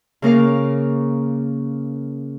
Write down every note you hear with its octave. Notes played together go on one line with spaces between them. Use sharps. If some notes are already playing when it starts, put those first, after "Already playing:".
C#3 A#3 A#4 F5